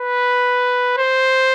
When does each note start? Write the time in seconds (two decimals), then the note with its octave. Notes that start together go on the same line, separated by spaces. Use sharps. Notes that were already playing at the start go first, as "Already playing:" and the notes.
Already playing: B4
0.98 C5